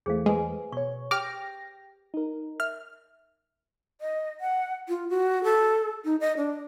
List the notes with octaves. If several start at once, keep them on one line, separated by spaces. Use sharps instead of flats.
E2 E3 A3 G#4 C5 F5
G#3 B4 G#5
B2 C#5 C#6
G4 G5 D6 F6 A#6
D#4 A#4
E5 F6
D#5
F#5
F4
F#4
A4
D#4
D#5
D4